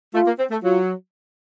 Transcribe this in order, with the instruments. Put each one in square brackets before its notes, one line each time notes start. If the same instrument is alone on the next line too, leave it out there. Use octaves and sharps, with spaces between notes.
[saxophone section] A3 [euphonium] F4
[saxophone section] A#3
C4
A3
[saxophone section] F#3 [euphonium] F4